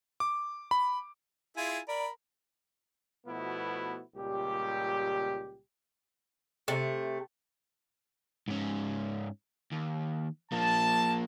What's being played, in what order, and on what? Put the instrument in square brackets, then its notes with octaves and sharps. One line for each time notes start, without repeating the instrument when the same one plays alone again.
[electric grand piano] D6
B5
[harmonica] E4 F4 G#4 [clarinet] G#5
[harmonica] A#4 B5 [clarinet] D5
[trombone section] B2 F3 A3 B3 E4 F#4
C#2 A#2 G3 G4
[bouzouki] C3 A3
[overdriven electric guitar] G#2 C#4
D#2
[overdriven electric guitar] F3 A#3 [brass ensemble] A5